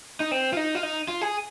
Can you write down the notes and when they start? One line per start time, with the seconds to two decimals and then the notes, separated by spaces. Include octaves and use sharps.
0.20 D#4
0.32 C4
0.53 F4
0.57 D#4
0.75 F4
0.83 D#4
1.08 F4
1.21 G#4